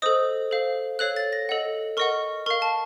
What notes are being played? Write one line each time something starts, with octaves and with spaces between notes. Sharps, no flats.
A4 C5 D#5 D#6
A4 C5 F5
A4 C#5 F5 F#6
A6
A#6
A4 D#5 F#5
A#4 D#5 F#5 C#6
A#4 F5 C#6
A5